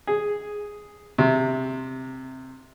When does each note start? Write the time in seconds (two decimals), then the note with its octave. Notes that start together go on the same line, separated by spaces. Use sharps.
0.07 G#4
1.18 C3